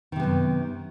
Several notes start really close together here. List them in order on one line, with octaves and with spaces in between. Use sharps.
D#3 C3 B3 F#2